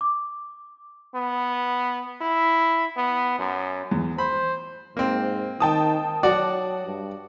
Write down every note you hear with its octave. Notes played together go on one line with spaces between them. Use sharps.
D6
B3
E4
B3
F#2
E2
C5 B5
G#2 A#3 C4
D#3 G5 A5 D#6
F#3 F#4 D5 F#5
G2